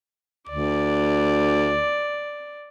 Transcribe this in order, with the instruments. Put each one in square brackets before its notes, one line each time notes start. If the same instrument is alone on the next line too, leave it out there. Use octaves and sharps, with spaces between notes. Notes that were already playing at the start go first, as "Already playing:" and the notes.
[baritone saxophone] D2 [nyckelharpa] D5